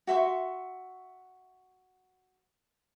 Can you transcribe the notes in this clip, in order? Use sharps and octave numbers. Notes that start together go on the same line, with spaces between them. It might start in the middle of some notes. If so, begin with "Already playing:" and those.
F#4 E5 C6 C#6